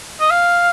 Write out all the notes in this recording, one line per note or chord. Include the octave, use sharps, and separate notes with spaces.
D#5
F5